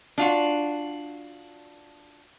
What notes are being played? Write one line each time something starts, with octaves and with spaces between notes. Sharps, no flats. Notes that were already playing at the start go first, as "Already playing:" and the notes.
D4 F4 F#4